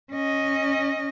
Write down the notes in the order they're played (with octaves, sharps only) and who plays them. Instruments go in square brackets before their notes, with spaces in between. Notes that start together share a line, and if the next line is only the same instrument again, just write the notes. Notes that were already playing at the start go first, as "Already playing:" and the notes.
[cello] C#4 D#5